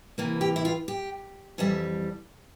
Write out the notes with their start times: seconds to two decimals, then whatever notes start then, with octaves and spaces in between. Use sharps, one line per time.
0.18 C3 E3 A#3
0.41 G4
0.56 E4
0.65 F4
0.88 G4
1.58 F2 E3 G3 E5